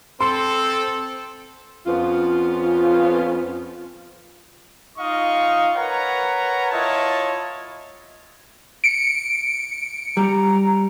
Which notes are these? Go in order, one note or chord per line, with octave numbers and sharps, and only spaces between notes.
C4 A4 C6
F2 B3 C#4 F4
D#4 F4 D#5 F5 C#6
A#4 B4 C#5 F#5 A#5
E4 F4 C#5 D#5 A5
C#7 D7
G3 A#5